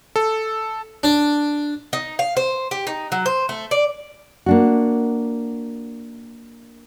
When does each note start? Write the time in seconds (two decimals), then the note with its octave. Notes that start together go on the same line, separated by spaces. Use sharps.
0.16 A4
1.03 D4
1.93 D#4
2.19 F5
2.37 C5
2.71 G4
2.87 D#4
3.12 F#3
3.26 C5
3.49 A3
3.71 D5
4.46 A#3 D4 F#4